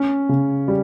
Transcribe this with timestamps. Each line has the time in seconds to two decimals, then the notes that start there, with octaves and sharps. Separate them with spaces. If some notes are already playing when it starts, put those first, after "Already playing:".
Already playing: C#4
0.29 C#3
0.68 G3